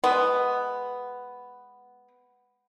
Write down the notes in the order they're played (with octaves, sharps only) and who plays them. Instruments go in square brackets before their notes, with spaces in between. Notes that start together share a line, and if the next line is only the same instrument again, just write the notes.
[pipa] G#3 B3